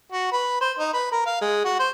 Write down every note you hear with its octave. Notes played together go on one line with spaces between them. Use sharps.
F#4
B4
C5
D#4
B4
A#4
F5
G#3
F#4
C5